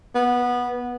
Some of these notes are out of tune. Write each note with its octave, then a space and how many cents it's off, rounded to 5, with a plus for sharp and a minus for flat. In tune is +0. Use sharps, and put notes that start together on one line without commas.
B3 -15